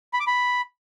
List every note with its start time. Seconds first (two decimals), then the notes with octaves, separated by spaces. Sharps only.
0.13 B5
0.20 D6
0.27 B5